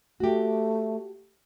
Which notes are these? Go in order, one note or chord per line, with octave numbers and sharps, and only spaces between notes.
A3 F#4 G4